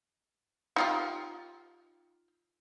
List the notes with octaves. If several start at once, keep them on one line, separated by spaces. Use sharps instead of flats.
D#4 F4 G4